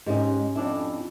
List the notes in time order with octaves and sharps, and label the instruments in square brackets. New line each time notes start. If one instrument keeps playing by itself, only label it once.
[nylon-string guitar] G#2 D#5 [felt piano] C#4 G4
[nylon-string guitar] F2 D4 E4